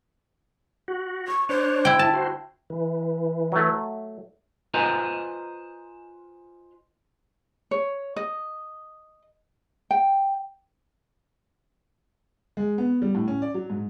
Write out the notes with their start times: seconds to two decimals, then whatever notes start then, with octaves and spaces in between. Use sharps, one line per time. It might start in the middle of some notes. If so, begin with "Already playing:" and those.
0.88 F#4
1.28 C#6
1.49 D4 C5 C#5
1.85 E4 G5
1.99 E4 A5
2.13 F#4 C5
2.70 E3
3.52 F#3 A3
4.74 F4 B4 C5 D#5 G#5 A#5
7.71 C#5
8.16 D#5
9.91 G5
12.57 G#3
12.78 B3
13.02 G3
13.15 A2
13.28 C#4
13.42 D5
13.54 F#3
13.70 G#2